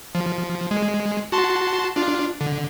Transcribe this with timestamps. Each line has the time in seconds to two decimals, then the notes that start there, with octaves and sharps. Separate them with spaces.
0.15 F3
0.71 G#3
1.32 F#4 A5 C6
1.96 D4 F4
2.41 D3